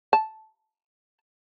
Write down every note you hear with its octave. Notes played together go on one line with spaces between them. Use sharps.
A5